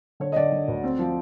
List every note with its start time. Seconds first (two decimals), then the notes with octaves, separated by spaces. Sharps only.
0.20 D3 C#5
0.32 D#5
0.36 D3 D5
0.52 D3
0.68 D2
0.84 C4
0.99 F3